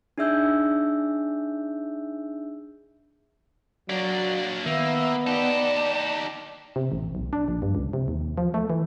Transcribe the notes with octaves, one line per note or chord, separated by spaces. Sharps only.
D4 D#4 G#4 E5 E6 G6
F#3 A#3 D4 D5
D#3 A#3 B3 E5
D#4 G4 D5 A5
C3
A1
B1
D4
A#1
G2
C#2
C3
D#2
F3
A3
E3